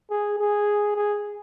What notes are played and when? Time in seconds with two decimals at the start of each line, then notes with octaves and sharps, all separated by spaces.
0.11 G#4
0.39 G#4
0.96 G#4